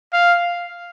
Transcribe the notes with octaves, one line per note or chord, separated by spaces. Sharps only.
F5